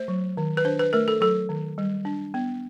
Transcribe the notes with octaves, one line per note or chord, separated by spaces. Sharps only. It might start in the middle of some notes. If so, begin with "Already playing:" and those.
Already playing: A3 C5
F#3
D#3
B4
D4 C5
B4
A3 A#4
A4
F#3 A4
D#3
G3
D4
B3